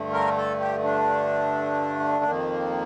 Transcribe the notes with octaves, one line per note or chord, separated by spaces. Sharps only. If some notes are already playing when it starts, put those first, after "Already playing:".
Already playing: G2 D3 A3
A#4
A4
G4
D4
F2 D#3 A#3